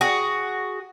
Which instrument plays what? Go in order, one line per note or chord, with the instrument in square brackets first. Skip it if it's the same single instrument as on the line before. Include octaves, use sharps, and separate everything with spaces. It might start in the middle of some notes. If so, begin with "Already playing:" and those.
[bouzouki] F#4 G#4